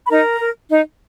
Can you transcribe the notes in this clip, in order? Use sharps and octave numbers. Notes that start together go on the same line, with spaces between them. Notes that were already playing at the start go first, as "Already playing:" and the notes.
B5
D#4 A#4 A#5
A#4
D#4